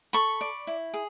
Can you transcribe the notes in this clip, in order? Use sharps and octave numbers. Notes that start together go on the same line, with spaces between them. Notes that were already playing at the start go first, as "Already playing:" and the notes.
A4 B5 C#6
D5
E4
G#4